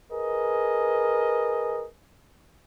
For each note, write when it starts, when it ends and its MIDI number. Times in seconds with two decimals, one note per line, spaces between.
0.12 1.86 68
0.12 1.86 70
0.12 1.86 71
0.12 1.86 75